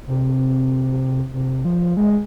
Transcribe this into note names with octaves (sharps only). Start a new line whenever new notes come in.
C3
C3
F3
G#3